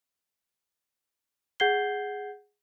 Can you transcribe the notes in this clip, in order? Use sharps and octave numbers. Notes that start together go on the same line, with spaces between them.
G#4 F#5 G6 G#6 C7 G7